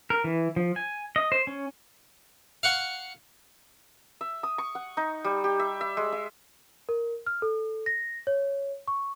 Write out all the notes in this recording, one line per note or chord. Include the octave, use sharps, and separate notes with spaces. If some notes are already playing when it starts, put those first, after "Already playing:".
A#4
E3
F3
G#5
D#5
C5
C#4
F5 F#5 C#6
E5
D#6
C#6
F#5
D#4
G3
G4
E5
E5
G#3
E5
A#4
F6
A4
A#6
C#5
C#6